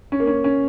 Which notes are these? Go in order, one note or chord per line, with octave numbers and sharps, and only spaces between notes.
C#4
A#3
C#4
C#4